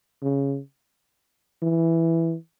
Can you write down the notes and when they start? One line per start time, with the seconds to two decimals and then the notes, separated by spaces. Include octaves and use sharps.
0.23 C#3
1.63 E3